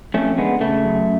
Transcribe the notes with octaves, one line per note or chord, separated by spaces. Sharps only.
F2 A3 C#4
D3 G#3 B3
C#3 A3
F#2